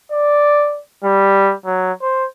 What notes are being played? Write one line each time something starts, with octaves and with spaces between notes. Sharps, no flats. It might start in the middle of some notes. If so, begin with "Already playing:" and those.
D5
G3
F#3
C5